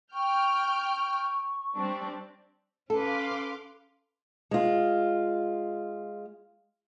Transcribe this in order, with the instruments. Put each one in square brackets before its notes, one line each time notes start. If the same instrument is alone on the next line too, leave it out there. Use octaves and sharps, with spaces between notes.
[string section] G5 F6 G6 [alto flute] C#6
[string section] G3 C4 D4
[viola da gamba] C#4 B4 [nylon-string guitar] A4 [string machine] F5 C6 D6
[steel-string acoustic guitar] G#3 F4